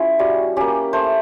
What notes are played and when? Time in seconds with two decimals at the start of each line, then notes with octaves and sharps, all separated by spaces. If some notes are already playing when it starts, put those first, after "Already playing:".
Already playing: G#3 C#4 E4 F4
0.19 G3 F#4
0.56 A#3 C#4 G4
0.93 A3 C5